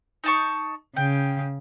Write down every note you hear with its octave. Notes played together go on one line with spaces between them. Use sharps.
D#4 A5 C#6
C#3 G5